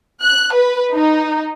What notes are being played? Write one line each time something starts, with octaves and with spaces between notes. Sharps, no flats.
F#6
B4
D#4